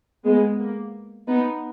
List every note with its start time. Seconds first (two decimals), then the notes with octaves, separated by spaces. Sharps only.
0.24 G#3 B3
0.59 A#3
1.27 B3 D#4